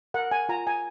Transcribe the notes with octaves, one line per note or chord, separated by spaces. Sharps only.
A#4 F#5
G#5
F4 A#5
G#5